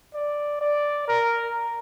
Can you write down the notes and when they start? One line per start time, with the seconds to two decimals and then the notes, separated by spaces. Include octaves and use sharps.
0.14 D5
0.61 D5
1.08 A#4